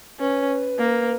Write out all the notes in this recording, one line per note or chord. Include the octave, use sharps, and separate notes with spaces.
C#4 B4
A#3